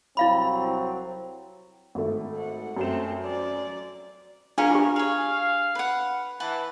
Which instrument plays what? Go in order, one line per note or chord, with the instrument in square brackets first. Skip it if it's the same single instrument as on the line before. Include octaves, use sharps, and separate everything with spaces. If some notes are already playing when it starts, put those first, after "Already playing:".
[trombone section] C2 F#3 C4 [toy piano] E4 F5 B5
[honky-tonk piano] G#1 A3
[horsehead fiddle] F#5
[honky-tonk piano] F#2 E7 [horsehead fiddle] A3 C4
[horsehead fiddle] D5
[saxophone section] B3 C#4 [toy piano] D4 F4 F5 [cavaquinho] G#4 A#4
[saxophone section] G2 E3 G3 [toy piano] F4 G4
[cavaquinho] G#4 C#5 [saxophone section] F5
[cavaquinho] B4 F#5
[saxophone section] E3 [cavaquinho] B4 F#5 A5